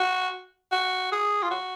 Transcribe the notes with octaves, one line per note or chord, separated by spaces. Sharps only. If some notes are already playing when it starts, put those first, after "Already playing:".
Already playing: F#4
F#4
G#4
F4
F#4